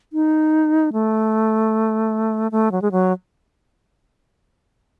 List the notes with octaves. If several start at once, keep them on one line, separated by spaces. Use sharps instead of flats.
D#4
A3
A3
F#3
G#3
F#3